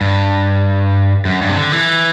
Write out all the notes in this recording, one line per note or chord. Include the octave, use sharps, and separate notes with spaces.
G2
F#2
G2
C3
D3
E3